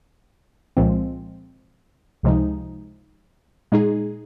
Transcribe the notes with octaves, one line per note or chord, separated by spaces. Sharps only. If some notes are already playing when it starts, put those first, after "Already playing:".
C2 A#2 F3 G#3 C4
C#2 C3 F3 G#3 D#4
A#2 G#3 D#4 G#4